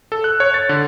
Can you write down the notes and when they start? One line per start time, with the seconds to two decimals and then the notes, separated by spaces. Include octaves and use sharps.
0.12 A4
0.24 F#6
0.40 C#5
0.54 A6
0.69 D3